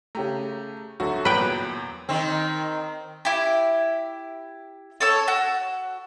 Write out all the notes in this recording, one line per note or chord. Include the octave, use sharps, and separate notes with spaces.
C#3 A3 G4 A#5
D2 F#3 F#4 A4
E2 A#2 F#3 B4 G5
D#3 C4
E4 G4
A4 C#5 E6
F#4